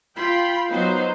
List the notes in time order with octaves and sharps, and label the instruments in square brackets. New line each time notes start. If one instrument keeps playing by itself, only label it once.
[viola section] F4 G5 B5 C6
F#3 B3 D#4 C5